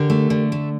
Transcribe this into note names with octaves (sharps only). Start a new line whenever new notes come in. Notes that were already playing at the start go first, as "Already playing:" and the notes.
Already playing: D3 G4 A#4
A3
D3
A3